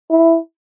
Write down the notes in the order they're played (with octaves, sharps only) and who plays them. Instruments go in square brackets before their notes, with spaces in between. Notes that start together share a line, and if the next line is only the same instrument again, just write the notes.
[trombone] E4